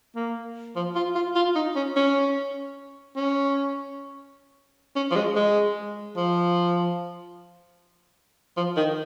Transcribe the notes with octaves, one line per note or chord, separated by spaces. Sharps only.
A#3
F3
F4
F4
F4
D#4
C#4
C#4
C#4
C#4
F3
G#3
G#3
F3
F3
D#3